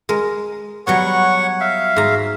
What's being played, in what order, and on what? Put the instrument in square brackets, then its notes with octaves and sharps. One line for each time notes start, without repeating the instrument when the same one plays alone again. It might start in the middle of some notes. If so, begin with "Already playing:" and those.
[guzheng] G#3 A#4
[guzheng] F#3 G3 B3 [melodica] C#5 F#5 C#6
[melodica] E5 F5
[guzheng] G#2 A#5